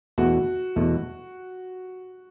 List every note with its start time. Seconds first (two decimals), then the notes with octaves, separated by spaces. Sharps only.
0.18 E2 B2 A3 F#4
0.76 E2 B2 A3